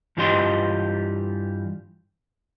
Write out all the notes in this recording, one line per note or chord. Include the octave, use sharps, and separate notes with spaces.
G2 E3 F4 G4 D#5 C6